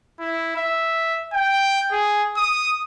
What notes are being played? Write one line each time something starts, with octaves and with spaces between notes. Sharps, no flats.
E4
E5
G5
G#4
D#6